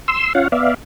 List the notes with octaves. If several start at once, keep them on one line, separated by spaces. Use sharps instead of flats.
C6 E6
C#4 F4 C#5 F5 F#5
B3 D5 E5 F5